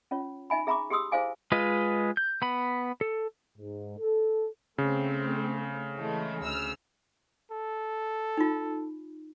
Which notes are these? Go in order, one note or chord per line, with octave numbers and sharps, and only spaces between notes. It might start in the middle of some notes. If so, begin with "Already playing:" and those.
C#4 F4 C#5
D#4 E5 G#5 B5
G#4 E5 A#5 B5 C#6 D6
G4 G#4 C6 D#6 E6
E4 G#4 C5 F5 G#5 D6
G#3 F4 B4 D#5
G6
B3 B5
A4
G#2
A4
C#3 A3 C4
E3 G#3 A3
D2 E6 F6
A4
D#4 F4